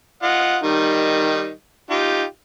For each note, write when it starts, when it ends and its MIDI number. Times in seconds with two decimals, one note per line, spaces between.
0.23 0.57 65
0.23 0.57 75
0.23 0.57 78
0.63 1.51 51
0.63 1.51 55
0.63 1.51 63
1.90 2.24 63
1.90 2.24 65
1.90 2.24 67